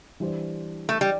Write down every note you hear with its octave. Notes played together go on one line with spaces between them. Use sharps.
E3 G3 D4 C5
A3
G3